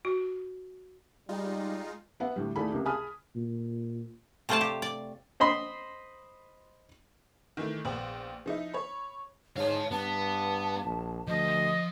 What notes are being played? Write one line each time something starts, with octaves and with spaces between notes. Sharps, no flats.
F#4
G3 G#3 D#4 F4
B3 E5 F#5
D2 A2 G3
D#2 A3 E4 G#4 D5 B5
C#2 C3 A#3 G4
G#4 G#5 A5 B5 D#6 F6
A#2
C3 A3 F4 C5 D5 A5
G4
D5
C5 D#5 B5 C6
D#3 E3 A3
A#1 B3 C5 G5 F#7
F3 D#4 E4
C#5 B5
G#2 C#5 F5 A5
G2 B3 A5
A#1
D2 F3 D#5